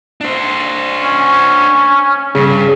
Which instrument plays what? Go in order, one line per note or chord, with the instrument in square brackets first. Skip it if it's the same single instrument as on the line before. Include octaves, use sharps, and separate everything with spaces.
[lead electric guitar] D4 C5
[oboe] C#4
[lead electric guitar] G2 [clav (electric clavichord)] C#3